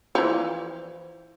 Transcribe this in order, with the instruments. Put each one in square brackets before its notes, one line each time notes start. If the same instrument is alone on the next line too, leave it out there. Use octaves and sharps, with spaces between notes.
[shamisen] E3 F3